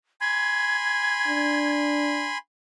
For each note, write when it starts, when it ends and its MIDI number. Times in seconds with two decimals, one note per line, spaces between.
0.21 2.38 80
0.21 2.38 83
0.21 2.38 84
0.21 1.72 92
1.28 2.32 62